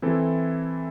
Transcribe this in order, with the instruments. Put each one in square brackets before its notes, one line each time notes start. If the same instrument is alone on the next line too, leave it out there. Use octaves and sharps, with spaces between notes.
[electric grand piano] E3 C4 E4 A4